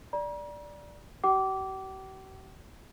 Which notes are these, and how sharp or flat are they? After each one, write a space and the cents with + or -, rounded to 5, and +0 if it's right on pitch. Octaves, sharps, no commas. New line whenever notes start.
D5 +0 A#5 +40
G4 -45 G5 -45 D6 -15